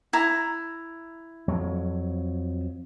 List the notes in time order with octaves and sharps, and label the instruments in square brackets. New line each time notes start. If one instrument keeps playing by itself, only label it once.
[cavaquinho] E4 A#5
[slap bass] F2 F#3